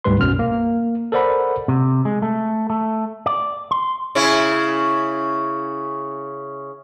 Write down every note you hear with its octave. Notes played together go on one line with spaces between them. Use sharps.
D2 G#2 G3 B4 C6
B1 F#2 B2 F6
A#3
A4 A#4 C5 D5 F#5 B5
C3
G#3
A3
A3
D5
C6
C#3 C#4 E4